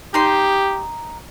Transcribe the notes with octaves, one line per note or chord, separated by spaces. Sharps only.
D#4 G4 C6